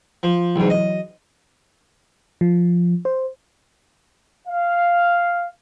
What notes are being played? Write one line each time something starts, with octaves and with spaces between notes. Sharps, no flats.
F3
C2 G#2 E3 F#3
D#5
F3
C5
F5